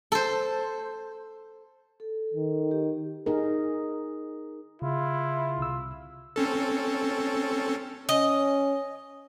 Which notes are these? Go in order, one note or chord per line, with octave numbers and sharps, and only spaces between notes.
A4 C5
A4
D#3
G4
D#4 G#4 A#4
C#3 E4 F4
C2 C3 E6
C4 C#4 A4
C#4 D#5